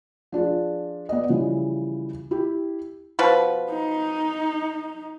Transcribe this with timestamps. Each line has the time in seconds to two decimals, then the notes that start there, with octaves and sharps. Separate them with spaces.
0.32 F3 D4 F4 G#4
1.09 B3 D5 D#5
1.29 C#3 E3 F3 G3
2.31 E4 G4
3.19 B2 F3 B4
3.70 D#4